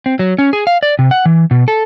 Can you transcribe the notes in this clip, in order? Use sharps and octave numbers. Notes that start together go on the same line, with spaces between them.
C4
F#3
C#4
G#4
F5
D5
C3
F#5
E3
B2
A4